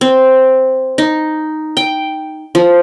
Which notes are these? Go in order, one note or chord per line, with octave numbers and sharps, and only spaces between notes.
C4
D#4
G5
F3